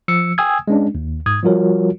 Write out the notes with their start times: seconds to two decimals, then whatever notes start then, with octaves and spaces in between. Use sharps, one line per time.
0.08 F3 E6 C#7
0.38 G5 G#5 D#6 E6 G#6
0.68 G#3 C#4 D4
0.95 D#2
1.26 G#2 D#6 G#6
1.43 F3 G3 F4 F#4 A#4 C#5